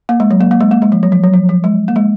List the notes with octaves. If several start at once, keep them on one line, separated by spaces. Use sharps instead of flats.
A#3
G#3
F#3
A#3
A#3
G#3
A#3
G#3
F3
F#3
F3
F#3
F3
F3
G#3
A#3
G#3